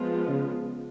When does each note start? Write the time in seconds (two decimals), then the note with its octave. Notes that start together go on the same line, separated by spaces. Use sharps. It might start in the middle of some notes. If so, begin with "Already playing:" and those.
Already playing: F3 G#3 B3 F4
0.28 C#3